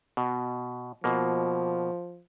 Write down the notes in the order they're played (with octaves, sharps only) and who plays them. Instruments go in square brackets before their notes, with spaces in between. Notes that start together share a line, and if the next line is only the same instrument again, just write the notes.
[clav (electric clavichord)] B2
[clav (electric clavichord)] B2 A#3 [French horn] F3